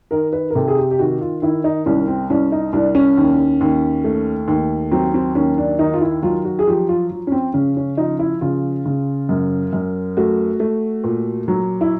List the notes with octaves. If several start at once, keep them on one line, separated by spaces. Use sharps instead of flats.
D#3 A#4
B4
A#4
C3 A4
G#4
G4
G4
D#3 F#4
F4
D#3 E4
D#4
C2 C#4
C4
C2 C#4
D#4
C2 D4
C#4
D#2
D#2
A3
D#2
F#3 C4
C4
D#2 C#4
D4
D#3 D#4
F4
E4
F#3 F4
F#4
G#4
F3 G4
F4
F3
C#4
C4
C#3 C#4
C#4
F3 D#4
E4
C#3 F4
C#3
F#2
F#2
A3 F#4
A3
A#2
F#3
E4